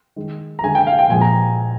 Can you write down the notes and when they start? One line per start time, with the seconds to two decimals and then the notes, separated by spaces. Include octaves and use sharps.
0.16 D#3 G#3
0.59 A#5
0.63 D3 G#3 G#5
0.75 G5
0.87 F5
0.99 G5
1.09 A#2 F3 G#3 G#5
1.21 A#5